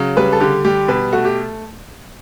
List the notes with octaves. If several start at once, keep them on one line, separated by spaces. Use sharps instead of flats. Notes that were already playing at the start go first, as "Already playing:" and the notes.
Already playing: C#3 F#3
G3 B4
A4
D3 G4
G3 G4
B2 B4
A3 F#4
G4